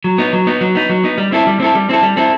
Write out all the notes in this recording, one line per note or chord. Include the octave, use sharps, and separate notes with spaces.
F#3
B3 D#4
F#3
B3 D#4
F#3
B3 D#4
F#3
B3 D#4
G3
C4 E4 A4
G3
C4 E4 A4
G3
C4 E4 A4
G3
C4 E4 A4